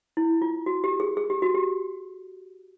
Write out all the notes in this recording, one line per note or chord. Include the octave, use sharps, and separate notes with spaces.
E4
F4
F#4
G4
G#4
G#4
G4
F#4
G4